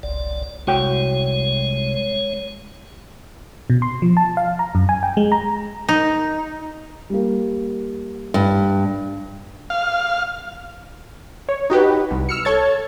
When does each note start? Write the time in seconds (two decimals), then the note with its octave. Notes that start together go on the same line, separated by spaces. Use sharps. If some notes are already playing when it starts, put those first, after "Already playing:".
0.03 F#1 C2 D5
0.67 C2 G#3 F#4 C#5 G5
3.70 B2
3.82 C6
4.02 F3
4.17 A5
4.37 F5
4.59 A#5
4.75 F#2
4.89 G#5
5.03 G5
5.17 G#3
5.32 A#5
5.89 D#4
7.10 G3 A#3
8.34 G2
9.70 F5
11.49 C#5
11.70 D#4 F#4 G4 B4
12.11 C2
12.29 E6 F6 C#7
12.45 A4 C#5 G#6 A6